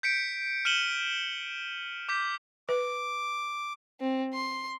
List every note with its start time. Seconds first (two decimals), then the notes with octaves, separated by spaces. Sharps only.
0.03 G6 B6 C#7 D7
0.65 F6 C#7 D#7 E7 F#7 G7
2.09 D6 G6 B6
2.69 B4 D6
4.01 C4
4.34 C6